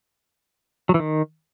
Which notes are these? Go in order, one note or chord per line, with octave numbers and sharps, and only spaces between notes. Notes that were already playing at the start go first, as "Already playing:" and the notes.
F#3
E3
D#3